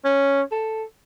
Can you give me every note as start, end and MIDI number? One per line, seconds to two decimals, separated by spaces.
0.05 0.42 61
0.52 0.84 69